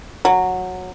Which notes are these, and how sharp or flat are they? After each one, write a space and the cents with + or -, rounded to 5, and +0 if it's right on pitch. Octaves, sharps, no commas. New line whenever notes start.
F#3 -10